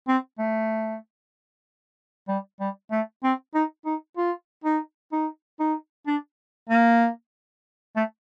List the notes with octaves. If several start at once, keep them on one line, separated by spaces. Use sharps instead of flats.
C4
A3
G3
G3
A3
C4
D#4
D#4
F4
D#4
D#4
D#4
D4
A#3
A3